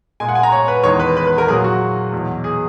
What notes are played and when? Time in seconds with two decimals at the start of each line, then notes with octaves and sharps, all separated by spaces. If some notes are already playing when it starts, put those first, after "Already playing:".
0.20 A#2 G#3 G#5
0.28 F#5
0.35 G#5
0.43 A#5
0.52 C#5
0.68 B4
0.83 E2 D#3 G#3 C#5
1.00 B4
1.17 B4
1.27 B4
1.38 A#4
1.48 A#2 F#3 G#4
1.64 F#4
2.12 E2 B2 F#3
2.44 G#4